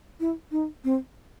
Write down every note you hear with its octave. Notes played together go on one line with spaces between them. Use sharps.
E4
D#4
C4